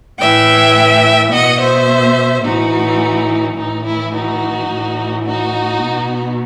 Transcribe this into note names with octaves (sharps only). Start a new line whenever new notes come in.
A2 E3 E5 G5
B2 D#5 F#5
C5 E5
A2 E3 D#4 F#4
A2 E3 D#4
E4
D#4 F#4
A2 E3
D#4 F#4
B2